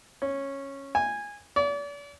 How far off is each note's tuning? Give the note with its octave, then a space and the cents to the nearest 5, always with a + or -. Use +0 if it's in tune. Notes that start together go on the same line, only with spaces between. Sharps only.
C#4 -10
G#5 -15
D5 -40